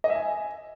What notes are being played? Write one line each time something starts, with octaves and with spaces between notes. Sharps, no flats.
D#5
E5
G#5